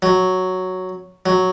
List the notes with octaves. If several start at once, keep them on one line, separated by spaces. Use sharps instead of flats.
F#3
F#3